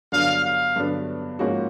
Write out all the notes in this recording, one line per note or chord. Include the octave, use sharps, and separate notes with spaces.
G2 D3 F#3 B3 D4 F5
F5
G2 D3 F#3 B3 D4
G#2 F3 A#3 C#4 F#4